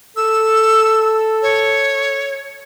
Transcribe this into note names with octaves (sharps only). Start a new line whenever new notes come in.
A4 E6
C#5